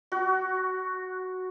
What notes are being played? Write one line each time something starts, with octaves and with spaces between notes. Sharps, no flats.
F#4